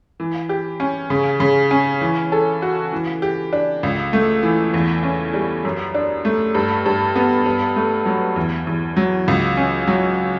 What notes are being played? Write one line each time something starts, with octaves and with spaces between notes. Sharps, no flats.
E3
G4
C#4
C#3
C#3
C#4
E3
A4
F#4
E3
G4
D4
C#2
A3
E3
E2
C#4
G3
F#2
D4
A3
G2
G2
B3
G2
A3
F#3
E2
E2
F#3
C#2
C#4
F#3